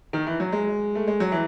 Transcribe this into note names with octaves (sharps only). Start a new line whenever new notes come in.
D#3
E3
F#3
G#3
A3
G#3
F#3
E3